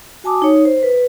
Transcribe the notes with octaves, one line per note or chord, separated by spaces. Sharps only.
F#4 G#5 A5 D6 D#6
D#4 C#5
C5
B4